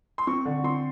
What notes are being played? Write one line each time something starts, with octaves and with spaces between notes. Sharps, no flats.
C6
C4 C#6
D3
C4 C6